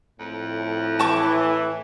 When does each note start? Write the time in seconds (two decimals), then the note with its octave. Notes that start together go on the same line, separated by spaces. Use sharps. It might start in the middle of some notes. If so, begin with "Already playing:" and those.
0.19 F2 A2
0.99 E3 A5 C#6 D6